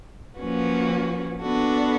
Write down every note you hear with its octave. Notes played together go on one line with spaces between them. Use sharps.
F3 A#3 C#4 F#4 B4
B3 D4 F#4 A4